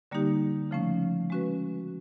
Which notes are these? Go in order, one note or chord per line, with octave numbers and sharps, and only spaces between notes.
D3 G3 A#3 D#4 G4
C#3 F3 A3 C#4
G#3 C#4 F#4 B4